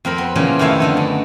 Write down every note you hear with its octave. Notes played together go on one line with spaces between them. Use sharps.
F2 C4 A#4 B5
B3
A#2 C#3 E3 F3 A#3 B3
F2 C3 D#3 A3 E4 F5
D3 B3 D#4
F#2